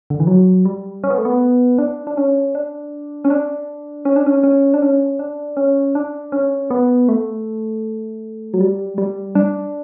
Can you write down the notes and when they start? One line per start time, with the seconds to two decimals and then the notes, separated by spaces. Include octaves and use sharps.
0.10 D3
0.20 E3
0.27 F#3
0.65 G3
1.04 C#4
1.10 B3
1.18 A3
1.25 B3
1.78 D4
2.07 D4
2.17 C#4
2.55 D4
3.25 C#4
3.30 D4
4.05 C#4
4.16 D4
4.26 C#4
4.43 C#4
4.74 D4
4.82 C#4
5.19 D4
5.57 C#4
5.95 D4
6.32 C#4
6.70 B3
7.09 A3
8.54 F#3
8.60 G3
8.98 G3
9.35 D4